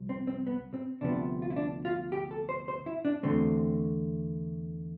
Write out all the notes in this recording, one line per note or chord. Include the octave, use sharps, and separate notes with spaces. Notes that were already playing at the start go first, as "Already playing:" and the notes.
Already playing: C2 F3
C4
C4
B3
C4
D2 C3 F3 B3 D4
F4
E4
D4
F4
G4
A4
C5
C5
E4
D4
E2 D3 A3 C4